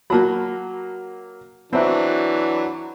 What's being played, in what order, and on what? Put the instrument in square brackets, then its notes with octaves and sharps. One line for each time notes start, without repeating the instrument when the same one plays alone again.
[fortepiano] F#3 A#3 [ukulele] F#4 A5 B5
[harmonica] E3 F#3 D4 [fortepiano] C4 F#4 [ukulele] B4 E5